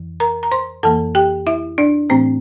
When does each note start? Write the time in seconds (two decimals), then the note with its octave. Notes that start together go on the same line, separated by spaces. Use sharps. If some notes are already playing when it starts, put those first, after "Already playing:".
Already playing: F2 E3
0.20 A#4 A#5
0.43 A#5
0.52 C5 C6
0.83 F2 E3 A#3 A4 A5
1.15 G4 G5
1.47 E4 E5
1.78 D4 D5
2.10 A2 E3 A3 C4 C5